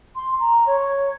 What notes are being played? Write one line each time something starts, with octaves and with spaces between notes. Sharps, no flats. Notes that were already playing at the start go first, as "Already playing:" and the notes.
C6
A#5
C#5